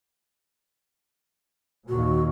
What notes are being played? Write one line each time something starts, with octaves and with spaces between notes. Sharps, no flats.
D#2 A#2 F#4